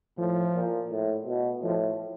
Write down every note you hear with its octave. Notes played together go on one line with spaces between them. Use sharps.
A2 F3
A#2
A2
B2
A2 F3